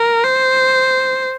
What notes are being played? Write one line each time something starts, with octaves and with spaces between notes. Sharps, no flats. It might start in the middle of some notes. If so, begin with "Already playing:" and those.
Already playing: A#4
C5